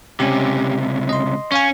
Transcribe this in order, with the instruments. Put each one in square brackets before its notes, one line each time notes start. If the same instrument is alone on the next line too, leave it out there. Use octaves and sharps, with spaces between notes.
[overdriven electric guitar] C#2 C3 [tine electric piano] C#4 G4
[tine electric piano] D#5 C6
[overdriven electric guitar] C#4 [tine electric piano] C#5 F5 G#5